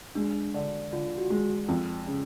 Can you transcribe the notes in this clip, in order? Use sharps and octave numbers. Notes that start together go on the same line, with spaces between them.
G#3 D4
D3
D3 F4
F#4
G#3
F2
C#3